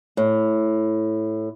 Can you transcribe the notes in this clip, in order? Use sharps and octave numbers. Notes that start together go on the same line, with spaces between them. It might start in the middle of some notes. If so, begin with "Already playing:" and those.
A2